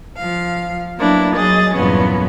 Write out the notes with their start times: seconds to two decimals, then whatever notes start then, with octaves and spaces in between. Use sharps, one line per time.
0.16 F3 F5
0.99 F#3 A#3 B3 D4 E4
1.36 F#3 G#4 D#5 A6
1.75 E2 G2 A#2 F#3 B3 C#4